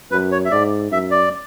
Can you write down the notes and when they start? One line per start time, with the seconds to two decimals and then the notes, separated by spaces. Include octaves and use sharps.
0.11 F#2 B4
0.32 C#5
0.45 E5
0.51 G#2 D5
0.91 F#2 E5
1.11 D5